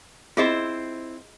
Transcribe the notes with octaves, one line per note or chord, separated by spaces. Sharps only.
C4 E4 F4 G#4 C5 D#5